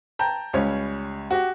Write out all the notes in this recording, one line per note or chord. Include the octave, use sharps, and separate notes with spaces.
G5 A5 A#5 G6
C#2 G3 C#4 C#5
F#4 G4